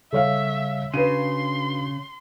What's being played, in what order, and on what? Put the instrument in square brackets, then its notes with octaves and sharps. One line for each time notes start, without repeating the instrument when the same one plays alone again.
[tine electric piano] C#3 G3 [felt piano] A4 C#5 F5 [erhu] E5
[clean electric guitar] C#3 [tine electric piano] D4 F#4 F5 [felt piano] B4 D#7 [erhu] C6